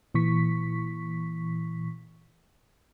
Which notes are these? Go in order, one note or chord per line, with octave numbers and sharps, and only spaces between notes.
A#2 E3 C#6 B6